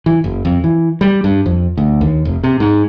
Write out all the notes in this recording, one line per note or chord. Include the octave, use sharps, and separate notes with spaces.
E3
F#1
F2
E3
G3
G2
F2
D2
D#2
F1
C3
G#2